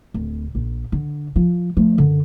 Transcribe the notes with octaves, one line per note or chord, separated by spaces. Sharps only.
D1
A#1
D3
F3
F3 A3
F#2 D3